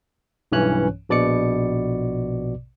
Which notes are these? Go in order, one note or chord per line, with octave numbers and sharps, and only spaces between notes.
B1 G2 E3 C#4 C#5 F#6
A#1 B2 D5 D6 C#7